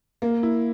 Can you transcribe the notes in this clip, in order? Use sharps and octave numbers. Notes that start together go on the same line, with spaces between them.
A#3
E4